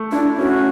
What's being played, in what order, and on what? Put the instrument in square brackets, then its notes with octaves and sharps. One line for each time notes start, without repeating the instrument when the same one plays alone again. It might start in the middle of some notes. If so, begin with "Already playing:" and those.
Already playing: [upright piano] A3
[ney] D4 [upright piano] E4
[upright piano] C#4 [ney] F#4